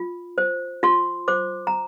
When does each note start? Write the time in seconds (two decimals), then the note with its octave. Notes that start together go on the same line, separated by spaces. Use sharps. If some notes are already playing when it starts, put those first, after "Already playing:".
Already playing: F4
0.38 C5
0.83 F4 C6
1.28 C5 D6
1.67 A#5